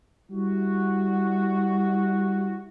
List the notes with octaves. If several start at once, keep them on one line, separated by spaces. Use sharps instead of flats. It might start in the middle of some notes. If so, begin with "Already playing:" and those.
G3 E4 F#4